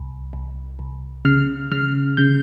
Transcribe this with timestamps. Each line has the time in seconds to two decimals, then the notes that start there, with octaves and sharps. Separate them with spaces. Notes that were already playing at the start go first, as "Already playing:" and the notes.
Already playing: C2
0.33 C2
0.79 C2
1.25 C#3 F6
1.72 C#3 F6
2.17 C#3 G6